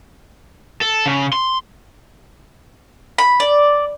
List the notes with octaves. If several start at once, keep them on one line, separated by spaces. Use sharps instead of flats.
A4
C#3
C6
B5
D5